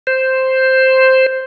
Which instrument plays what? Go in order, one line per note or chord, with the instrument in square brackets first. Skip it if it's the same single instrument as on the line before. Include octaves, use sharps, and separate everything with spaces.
[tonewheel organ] C5